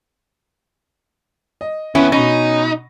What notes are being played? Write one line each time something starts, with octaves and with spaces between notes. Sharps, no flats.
D#5
D#2 B3 C#4 E4
B2 C#4 D#4 B5 A#6